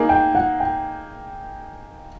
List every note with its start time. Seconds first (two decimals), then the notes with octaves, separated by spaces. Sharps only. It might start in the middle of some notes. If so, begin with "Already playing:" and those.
Already playing: A#3 D#4 G#4
0.09 G5
0.35 F#5
0.60 G5